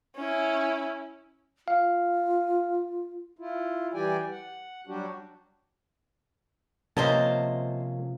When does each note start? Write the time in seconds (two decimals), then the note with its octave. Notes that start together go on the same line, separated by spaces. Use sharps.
0.17 C#4 E4
1.68 F4 F5
3.39 E4 F4
3.94 E3 G3 G4 D5 G5 G#5
4.31 F#5
4.87 F#3 G3 D4 F#4 G4
6.97 C3 F3 A#3 C#4 C5 D#5 A5